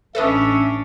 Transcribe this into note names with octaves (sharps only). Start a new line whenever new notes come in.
A1 C#4 D4 A4 B4 D#5 E5